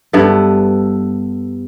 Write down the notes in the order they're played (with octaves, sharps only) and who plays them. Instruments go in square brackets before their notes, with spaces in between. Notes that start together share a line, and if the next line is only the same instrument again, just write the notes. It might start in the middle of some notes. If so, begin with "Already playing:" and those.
[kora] G2 B3 E4 A4